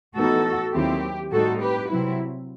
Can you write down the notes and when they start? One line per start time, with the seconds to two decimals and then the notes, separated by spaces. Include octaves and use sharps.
0.16 A2 E3 B3 D#4 F#4 A4
0.74 D#2 D#3 F#3 C4 E4 G4
1.32 A2 G3 C4 D#4 F#4 A4
1.62 G4 B4
1.91 C3 F#3 C4 E4